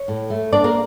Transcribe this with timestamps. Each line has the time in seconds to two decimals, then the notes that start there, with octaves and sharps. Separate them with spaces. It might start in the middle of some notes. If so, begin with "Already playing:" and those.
Already playing: C#5
0.08 A2
0.30 A3
0.53 A#3 D4 D5
0.64 A#3 A#4